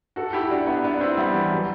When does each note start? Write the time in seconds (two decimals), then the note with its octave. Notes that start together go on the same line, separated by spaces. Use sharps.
0.16 F#4 A4
0.33 E4 G4
0.50 D4 F#4
0.67 B3 D4
0.84 B3 D4
1.00 C4 E4
1.17 G3 B3
1.35 E3
1.51 F#3